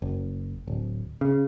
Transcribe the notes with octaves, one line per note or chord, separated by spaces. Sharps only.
F#1
D1
C#3